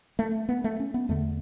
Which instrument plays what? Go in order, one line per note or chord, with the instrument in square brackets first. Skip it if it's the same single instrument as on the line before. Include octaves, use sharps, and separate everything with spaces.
[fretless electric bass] A3
B3
A3
C#4
B3
E2 D3 A3